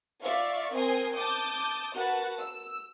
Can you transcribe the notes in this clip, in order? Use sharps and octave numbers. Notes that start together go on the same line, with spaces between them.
F4 D5 E5 F5 C#6
C4 A#4 G#5 C6 D#6
A5 D6 D#6 G6
F#4 A#4 B4 F#5 A5
E6